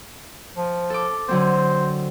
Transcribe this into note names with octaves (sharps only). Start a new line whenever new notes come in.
F3
A4 D6
D3 F#3 C4 C5